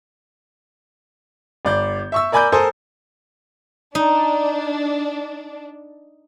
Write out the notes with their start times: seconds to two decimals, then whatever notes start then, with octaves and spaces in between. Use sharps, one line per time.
1.65 G1 D5 G6
2.12 E5 C#6 E6
2.32 A#4 D5 G#5 B5 D6 G6
2.52 A4 A#4 C5 G#5 C6 D#6
3.95 D4 D#4